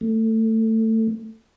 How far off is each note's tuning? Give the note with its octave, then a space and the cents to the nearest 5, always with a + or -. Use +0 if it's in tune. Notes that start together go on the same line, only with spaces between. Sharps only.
A3 +20